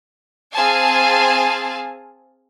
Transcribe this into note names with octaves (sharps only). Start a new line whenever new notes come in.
C4 G#4 F5 G#5 A5